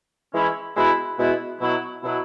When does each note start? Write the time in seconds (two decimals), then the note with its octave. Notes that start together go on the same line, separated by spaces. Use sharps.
0.32 E3 G#3 C#4 E4
0.76 B2 G#3 B3 E4
1.18 B2 G#3 B3 E4
1.61 B2 F#3 E4
2.03 B2 F#3 E4